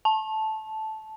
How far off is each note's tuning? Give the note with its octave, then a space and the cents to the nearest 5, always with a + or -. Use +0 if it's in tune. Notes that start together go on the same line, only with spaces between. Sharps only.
A5 -10